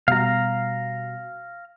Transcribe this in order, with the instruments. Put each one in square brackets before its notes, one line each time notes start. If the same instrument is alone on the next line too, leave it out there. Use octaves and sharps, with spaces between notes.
[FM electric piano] B2 G3 F#4 [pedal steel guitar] F5 A#5